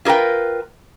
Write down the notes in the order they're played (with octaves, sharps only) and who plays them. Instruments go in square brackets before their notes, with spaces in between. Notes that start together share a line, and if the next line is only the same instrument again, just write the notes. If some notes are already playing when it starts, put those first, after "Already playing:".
[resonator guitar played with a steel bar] F4 G#4 A#4 B4 G5